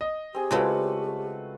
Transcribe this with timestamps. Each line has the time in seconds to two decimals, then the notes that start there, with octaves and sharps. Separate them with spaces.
0.01 D#5
0.35 C4 G4 G#4
0.51 C#3 G#3 A3 C4 F4 F#4 B4